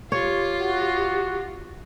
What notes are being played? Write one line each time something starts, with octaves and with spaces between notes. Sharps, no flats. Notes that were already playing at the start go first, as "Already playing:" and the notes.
F4 G4 C#5
F#4